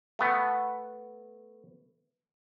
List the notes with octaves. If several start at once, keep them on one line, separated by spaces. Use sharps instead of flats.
A3 B3